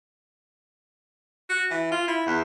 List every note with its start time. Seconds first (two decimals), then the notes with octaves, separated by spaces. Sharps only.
1.49 F#4
1.71 E3
1.92 F4
2.08 E4
2.27 E2